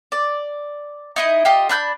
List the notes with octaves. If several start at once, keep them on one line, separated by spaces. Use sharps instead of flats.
D5
D#4 E4 D#5
F4 G4 D#5
D4 B5 F#6 G6